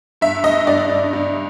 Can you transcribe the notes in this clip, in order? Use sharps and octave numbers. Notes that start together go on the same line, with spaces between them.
G2 E5
G2 D#5
G2 D5
G2
G2